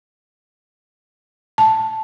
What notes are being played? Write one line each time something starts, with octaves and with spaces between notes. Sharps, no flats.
A5